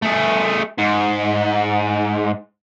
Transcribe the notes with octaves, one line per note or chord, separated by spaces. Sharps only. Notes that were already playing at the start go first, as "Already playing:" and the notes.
A3 G#4
G#2